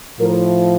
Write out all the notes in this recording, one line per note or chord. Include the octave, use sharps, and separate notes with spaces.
A2 F3 A#4